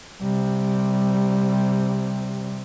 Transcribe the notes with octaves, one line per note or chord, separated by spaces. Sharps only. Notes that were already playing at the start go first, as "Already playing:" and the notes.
C3 G3